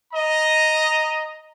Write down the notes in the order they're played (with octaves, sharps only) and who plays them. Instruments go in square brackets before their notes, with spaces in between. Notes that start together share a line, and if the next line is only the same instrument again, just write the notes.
[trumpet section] D#5 A#5